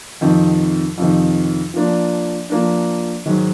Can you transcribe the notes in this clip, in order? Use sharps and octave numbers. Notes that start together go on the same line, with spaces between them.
F2 C3 D#3
F2 C3 D#3
F3 A#3 D4
F3 A#3 D4
G#2 D#3 F#3